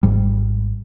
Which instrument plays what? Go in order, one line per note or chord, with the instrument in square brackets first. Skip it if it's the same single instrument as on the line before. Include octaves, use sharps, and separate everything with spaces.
[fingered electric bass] G#1 G#2 G3